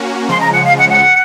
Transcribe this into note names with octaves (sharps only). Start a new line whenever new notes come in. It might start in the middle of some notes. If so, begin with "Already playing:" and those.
Already playing: A#3 C#4 F#4
C#3 F3 G#3 C6
A#5
F#5
F5
F#5
F#5